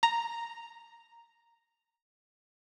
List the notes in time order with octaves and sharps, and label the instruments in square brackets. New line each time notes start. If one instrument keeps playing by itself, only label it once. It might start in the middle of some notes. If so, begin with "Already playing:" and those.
[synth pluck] A#5